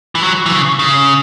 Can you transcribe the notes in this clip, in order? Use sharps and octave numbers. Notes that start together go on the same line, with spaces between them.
E3
F#3
E3
C#3
C#3